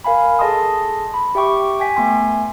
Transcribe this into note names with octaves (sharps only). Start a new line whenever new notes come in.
A#4 F5 G#5 B5
G#4 A4 D#5 A5 C6 D#6
B5
G4 E5 G5 C#6 D6
G5 G#5 B6
A3 B3 G#5 C6